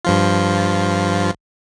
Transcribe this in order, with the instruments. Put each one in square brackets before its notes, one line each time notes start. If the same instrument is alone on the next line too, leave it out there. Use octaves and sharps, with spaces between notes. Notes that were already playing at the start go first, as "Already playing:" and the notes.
[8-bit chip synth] G2 F3 F4